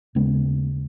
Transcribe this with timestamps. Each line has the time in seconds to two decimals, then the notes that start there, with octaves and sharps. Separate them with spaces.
0.15 D#2 C#3 G#3 B3